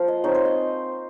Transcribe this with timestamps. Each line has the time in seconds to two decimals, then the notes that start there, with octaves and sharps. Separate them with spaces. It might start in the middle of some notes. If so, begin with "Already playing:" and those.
Already playing: F3 A#3 F5
0.08 D#5
0.24 G#3 C4 D#4 C#5
0.35 C5
0.45 D#5